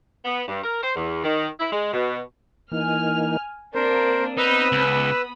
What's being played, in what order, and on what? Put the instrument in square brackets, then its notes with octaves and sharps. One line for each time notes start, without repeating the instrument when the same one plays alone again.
[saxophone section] B3
G2
A#4
C5
E2
D#3
E4
G#3
B2
[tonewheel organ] E3 A#3 D#4 [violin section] G#5 F6
[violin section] A#3 D4 [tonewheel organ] C4 [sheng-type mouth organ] A#4 C5
[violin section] B3 B5 D#6 [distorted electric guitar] D#4 [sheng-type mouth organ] B4 E6
[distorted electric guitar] C#2